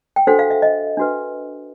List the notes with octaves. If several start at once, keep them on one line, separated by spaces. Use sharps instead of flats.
G5
D4 F#4 A4 C5 F#5
F5
E5
D#5
D4 F#4 B4